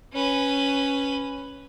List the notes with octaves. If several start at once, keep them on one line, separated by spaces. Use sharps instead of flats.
C#4 B4